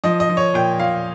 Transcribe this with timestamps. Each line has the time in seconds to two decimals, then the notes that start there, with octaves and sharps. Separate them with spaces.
0.04 F3 D#5
0.20 D#5
0.29 F3
0.37 C#5
0.54 A#2 G5
0.79 A#2 F5